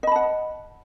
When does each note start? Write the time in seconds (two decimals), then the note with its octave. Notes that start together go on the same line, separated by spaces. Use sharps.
0.03 D#5
0.07 B5
0.11 A5
0.16 F#5